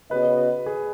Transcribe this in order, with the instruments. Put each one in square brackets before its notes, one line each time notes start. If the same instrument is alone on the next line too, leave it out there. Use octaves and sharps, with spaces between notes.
[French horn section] C#3 B3 F#4 D#5 [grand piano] B4
[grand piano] G#4